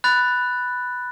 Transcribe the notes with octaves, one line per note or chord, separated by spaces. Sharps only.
B5 F#6 A6